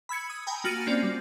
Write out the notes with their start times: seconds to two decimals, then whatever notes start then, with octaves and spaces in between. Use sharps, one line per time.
0.09 B5 E6 G#6 C#7
0.30 D#6
0.47 G5 G#5 A#5 B5
0.64 A#3 F#4 F6 A6 D7 D#7
0.86 A#3 C4 C#4 F4 D5
1.03 G3